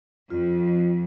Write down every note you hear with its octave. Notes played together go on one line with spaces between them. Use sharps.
F2 F4